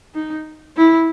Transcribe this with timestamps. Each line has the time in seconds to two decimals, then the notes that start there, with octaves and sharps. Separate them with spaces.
0.14 D#4
0.77 E4